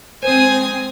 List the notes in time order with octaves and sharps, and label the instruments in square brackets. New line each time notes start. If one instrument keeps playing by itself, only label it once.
[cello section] G#3 C4 [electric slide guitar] C5 [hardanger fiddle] G#5 D#6